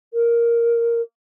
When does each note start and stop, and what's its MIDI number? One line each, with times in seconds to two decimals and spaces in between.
0.14 1.01 70